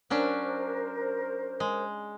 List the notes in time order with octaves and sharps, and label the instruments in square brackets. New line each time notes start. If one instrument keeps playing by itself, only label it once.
[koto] F#3 C#4 D4 [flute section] A#4 C5
[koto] G#3